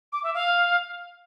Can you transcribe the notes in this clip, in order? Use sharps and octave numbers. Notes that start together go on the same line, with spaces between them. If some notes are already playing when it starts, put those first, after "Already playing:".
D6
E5
F5